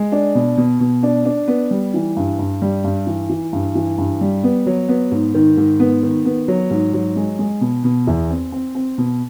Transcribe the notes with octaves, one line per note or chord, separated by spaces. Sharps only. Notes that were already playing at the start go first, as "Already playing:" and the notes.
Already playing: G#3
D4
B2
B2
B2
D4
D4
B3
G3
E3
G2
G2
G3
G2
E3
E3
G2
E3
G2
G3
B3
F#3
B3
G#2
D#3
G#2
B3
D#3
B3
F#3
G#2
F#3
G#3
G#3
B2
B2
E2
C4
C4
C4
B2